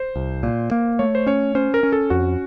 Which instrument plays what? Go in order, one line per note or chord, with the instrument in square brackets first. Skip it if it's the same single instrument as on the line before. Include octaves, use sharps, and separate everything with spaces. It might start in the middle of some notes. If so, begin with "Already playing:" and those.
Already playing: [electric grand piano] C5
[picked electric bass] C2
A#2
A#3
[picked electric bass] A3 [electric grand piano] C#5
[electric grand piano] C5
[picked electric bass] C#4 [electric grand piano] C#5
[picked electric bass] C#4 [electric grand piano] C5
[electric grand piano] A#4
[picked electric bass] C#4
[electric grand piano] A4
[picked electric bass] F2 [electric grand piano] F#4